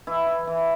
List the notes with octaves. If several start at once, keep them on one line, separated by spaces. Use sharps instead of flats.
E3 E4
E4
E3